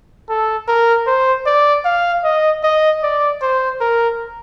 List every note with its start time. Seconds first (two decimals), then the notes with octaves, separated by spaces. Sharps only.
0.29 A4
0.68 A#4
1.07 C5
1.46 D5
1.85 F5
2.24 D#5
2.63 D#5
3.03 D5
3.42 C5
3.81 A#4